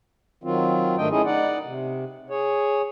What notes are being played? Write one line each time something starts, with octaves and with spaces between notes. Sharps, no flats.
D#3 F#3 C4 F4
G#2 D#3 A3 D4 D#5 G5
A3 C#4 D#4 E4 G#4 D#5
D#4 D5 F#5
C3
G#4 C#5